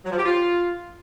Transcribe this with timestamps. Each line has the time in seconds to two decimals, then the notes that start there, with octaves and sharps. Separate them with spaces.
0.05 F#3
0.12 F3
0.18 G4
0.25 F4